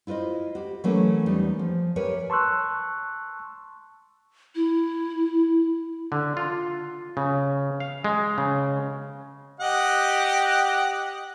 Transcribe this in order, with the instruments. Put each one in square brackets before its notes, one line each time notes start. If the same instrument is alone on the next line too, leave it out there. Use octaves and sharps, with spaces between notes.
[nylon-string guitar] E4 F4 B4 C5 D#5
F#4 G4
E3 F#3 A3 A#3 C#4 E4
E2 G3 D#4
F3
G4 A#4 B4 C#5 E5 G#5
[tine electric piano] A5 C6 C#6 E6 F#6
[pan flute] E4
[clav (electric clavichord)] D3
F4
C#3
F5
G#3
C#3
[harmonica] G4 D#5 F#5